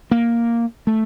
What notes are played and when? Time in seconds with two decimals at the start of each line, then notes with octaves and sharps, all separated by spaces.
0.11 A#3
0.87 A3